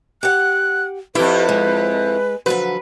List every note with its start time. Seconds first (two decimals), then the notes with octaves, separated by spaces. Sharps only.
0.23 G4 F#5 F#6
1.15 F2 E4 G4 B4
1.49 G#3
2.46 D3 F3 F#3 B4